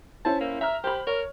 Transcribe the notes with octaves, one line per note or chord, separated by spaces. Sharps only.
C#4 E4 C5 A5
A#3
E5 A#5 F6
G4 C5 B5
A#4 C#5